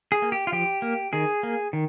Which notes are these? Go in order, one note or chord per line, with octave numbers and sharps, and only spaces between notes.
G#4
A#3
G4
F4
F3 G4
A#3
D#3 G#4
A#3
D#3